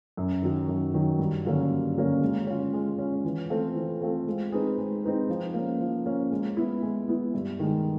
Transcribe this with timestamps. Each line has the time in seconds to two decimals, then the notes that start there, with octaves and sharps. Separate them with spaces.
0.17 F#2
0.42 D#3 F#3
0.68 F#2
0.94 D#3 F#3
1.19 G2
1.45 D3 F#3 A#3 C#4
1.71 G2
1.96 D3 F#3 A#3 C#4
2.21 G#3
2.47 C#4 F4
2.73 G#3
2.98 C#4 F4
3.25 E3
3.50 A3 C4 F4 A4
3.75 E3
4.01 A3 C4 F4 A4
4.27 G#3
4.52 C4 D#4 G#4 B4
4.78 G#3
5.03 C4 D#4 G#4 B4
5.29 F3
5.54 A#3 C#4
5.81 F3
6.06 A#3 C#4
6.32 G#3
6.57 B3 E4
6.83 G#3
7.08 B3 E4
7.34 G2
7.59 D#3 G#3